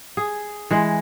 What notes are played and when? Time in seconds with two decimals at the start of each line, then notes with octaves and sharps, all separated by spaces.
0.17 G#4
0.71 E3 G#3